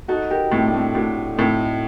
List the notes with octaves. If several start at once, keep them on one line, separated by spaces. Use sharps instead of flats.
D#4 F#4 A4
G4 A#4
A2 A3 C4
D4
A3 C4
A2 D4 F#4
A2 C4 D#4